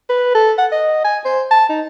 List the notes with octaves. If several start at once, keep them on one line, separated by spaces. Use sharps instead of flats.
B4
A4
F#5
D#5
G#5
C5
A5
D#4